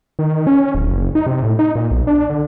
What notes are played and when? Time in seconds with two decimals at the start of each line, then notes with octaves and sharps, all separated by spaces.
0.19 D#3
0.47 C#4
0.75 D1
0.87 F#1
1.15 D#4
1.26 C3
1.43 A2
1.59 D#4
1.75 A#2
1.91 B1
2.07 D4
2.30 D3